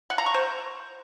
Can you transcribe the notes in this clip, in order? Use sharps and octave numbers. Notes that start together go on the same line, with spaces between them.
F#5
A#5
C#6
C5